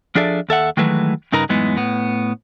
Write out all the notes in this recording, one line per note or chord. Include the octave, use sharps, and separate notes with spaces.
F3 D4 G#4 A4 D5 E5
D#2 A4 E5 F#5
D#3 E3 F#3 G#3 A3 B4
G2 C#3 D#4 A#4 B4 A#5
F#2 A2 E3 G#3 B3 D#4
A2 B3